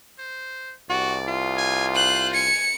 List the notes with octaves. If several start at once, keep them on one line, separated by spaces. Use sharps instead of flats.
C5
C2 F#4 D5
F4
G#5
C5 F#6
G#5 C#7